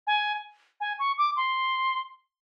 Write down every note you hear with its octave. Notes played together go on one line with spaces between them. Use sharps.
G#5
G#5
C#6
D6
C6